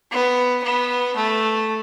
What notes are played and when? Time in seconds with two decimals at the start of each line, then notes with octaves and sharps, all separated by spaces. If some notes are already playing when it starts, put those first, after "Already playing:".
0.12 B3
0.64 B3
1.16 A3